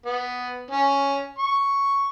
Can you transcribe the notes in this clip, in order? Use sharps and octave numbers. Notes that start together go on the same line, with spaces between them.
B3
C#4
C#6